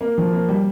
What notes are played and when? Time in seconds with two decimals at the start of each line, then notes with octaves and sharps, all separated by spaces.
0.01 A#3
0.18 F3
0.33 A#3
0.49 G3